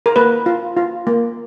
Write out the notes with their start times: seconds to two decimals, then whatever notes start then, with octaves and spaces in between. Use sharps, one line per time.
0.06 A#4
0.16 A#3 B4
0.46 F4
0.77 F4
1.07 A#3